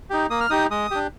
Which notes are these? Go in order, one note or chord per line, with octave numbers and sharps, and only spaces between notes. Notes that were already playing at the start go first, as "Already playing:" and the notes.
D#4 G4
A#3 D#6
F6
D#4 G4 D#6
G#3 D#6
D4 G4